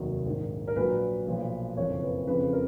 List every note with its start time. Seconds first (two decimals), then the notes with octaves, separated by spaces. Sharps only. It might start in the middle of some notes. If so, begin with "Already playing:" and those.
Already playing: F1 D#2 D#3 F#3
0.25 A#1 G#2 D#3
0.68 A#4
0.76 A#1 A#2 F#3 B4
1.27 B1 A#2 F3
1.77 F#1 F2 F3 C#5
2.02 B4
2.27 F2 C#3 F3 B4
2.53 A#4